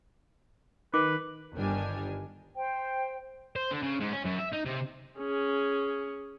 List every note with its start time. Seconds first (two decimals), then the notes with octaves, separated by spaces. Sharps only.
0.94 D#3 B4 D6
1.55 G1 D#3 G3 D4 G#5 F6
2.56 C5 G5
3.56 C5
3.71 D3
3.83 C#3
4.00 G#2
4.13 C#4
4.25 F#2
4.39 E5
4.53 D#4
4.66 C3
5.19 C#4 G#4